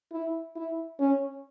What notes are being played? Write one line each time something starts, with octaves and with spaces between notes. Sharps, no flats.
E4
E4
C#4